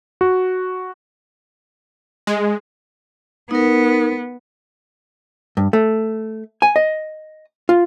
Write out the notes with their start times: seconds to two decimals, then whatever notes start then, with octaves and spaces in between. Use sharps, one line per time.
0.21 F#4
2.27 G#3
3.51 B3 D#4 A#4
5.57 G2
5.73 A3
6.62 G#5
6.76 D#5
7.69 F4